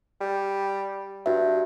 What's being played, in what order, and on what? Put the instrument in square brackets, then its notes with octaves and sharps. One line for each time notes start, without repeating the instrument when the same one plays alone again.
[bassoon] G3
[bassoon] G2 [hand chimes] F#4 E5